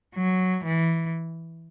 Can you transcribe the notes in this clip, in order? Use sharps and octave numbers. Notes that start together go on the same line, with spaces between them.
F#3
E3